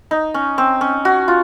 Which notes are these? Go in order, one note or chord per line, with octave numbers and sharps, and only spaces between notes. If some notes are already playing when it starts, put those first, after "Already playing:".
D#4
C#4
C4
C#4
F#4
F4